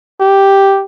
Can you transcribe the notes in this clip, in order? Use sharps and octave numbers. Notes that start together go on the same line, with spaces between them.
G4